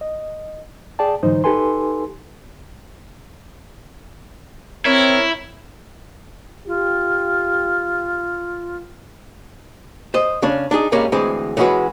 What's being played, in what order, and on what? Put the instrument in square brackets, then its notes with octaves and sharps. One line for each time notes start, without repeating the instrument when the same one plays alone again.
[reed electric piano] D#5
G#4 D5 G5 A5
G#2 D3 E3 F#3 D#4 C5
D#4 G4 A4 B4 G#5 C6
[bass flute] C4 [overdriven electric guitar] E4 [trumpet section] A#4 C#5
[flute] F4 [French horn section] G4
[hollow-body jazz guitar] C5 D#5
C#3 C#4 D4
D4 D#4 G#4
G2 G3 G#3 A#3 C#4
D2 E3 G#3 C4 G#4
E3 G#3 C#4 D#4 F#4 B4